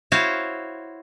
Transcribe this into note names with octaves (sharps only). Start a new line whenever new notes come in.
E4 F#4 C5 C#5 F5